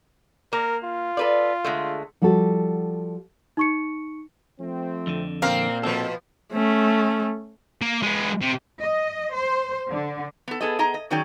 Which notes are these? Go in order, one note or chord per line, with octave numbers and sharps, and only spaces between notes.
A#3 A#4
F4
A4 B4 D5
D3 G#3 A3
F3 G3 F#4 G4 A4
D#4 C#6 C#7
F3 A3 C4
F2 D3
A#2 A#3 C4 A#4 F5
B2 F3 C4 A4
A3 C#4
A#3
G#3 B3
C3
D#5
C5
D3
B3 A4
B3 G#4 A4 B4 D#5
B3 G#4 D#5 A#5
D#5
D#3 F#3 C#4 G#4 D5 G5